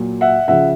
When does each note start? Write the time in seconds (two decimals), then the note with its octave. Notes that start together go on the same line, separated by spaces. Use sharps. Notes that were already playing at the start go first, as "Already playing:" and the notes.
Already playing: A#2 F#3
0.21 E5 F#5
0.48 C#3 F3 E5 F#5